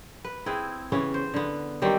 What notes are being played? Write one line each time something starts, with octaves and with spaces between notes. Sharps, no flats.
B4
C4 E4 G#4 B4
C#3 E3 B3 C#4
C5
D3 B3
D#3 F#3 G3 C4